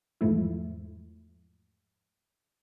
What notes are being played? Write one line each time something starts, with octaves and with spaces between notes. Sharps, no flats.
E2 G#2 F3 A3 E4